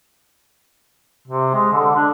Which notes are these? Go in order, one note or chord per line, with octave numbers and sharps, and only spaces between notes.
C3
G#3
D3
D4